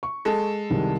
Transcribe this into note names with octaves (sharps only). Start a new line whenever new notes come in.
C#6
G#3 A4
C2 D#3 G3